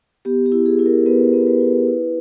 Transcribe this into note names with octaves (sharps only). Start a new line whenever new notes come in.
B3 G4
G4
E4
G#4
E4
A#4
B3 B4
B3
B4
E4
E4